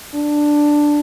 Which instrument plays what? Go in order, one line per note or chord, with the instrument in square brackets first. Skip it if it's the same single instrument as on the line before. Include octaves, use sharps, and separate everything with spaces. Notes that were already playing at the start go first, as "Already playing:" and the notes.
[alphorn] D4